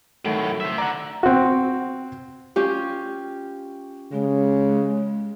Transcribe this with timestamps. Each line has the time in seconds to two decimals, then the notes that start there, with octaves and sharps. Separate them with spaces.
0.25 A2 D#3 F#3 A3 D7
0.60 C5 E5
0.78 D5 F#5 A#5
1.23 C4 F#4
2.56 C#4 F4 G4
4.12 C#3 G#3